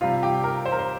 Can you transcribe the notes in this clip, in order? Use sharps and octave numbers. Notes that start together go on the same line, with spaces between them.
C3 G3 F4
G4
A#4
C5
A#4
C5